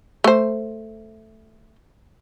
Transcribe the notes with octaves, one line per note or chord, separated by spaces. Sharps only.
A3 C5